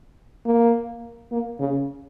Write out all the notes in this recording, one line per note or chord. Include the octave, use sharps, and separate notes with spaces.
A#3
A#3
C#3